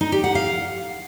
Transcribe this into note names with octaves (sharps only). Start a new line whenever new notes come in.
D#4
G4
F#5
F5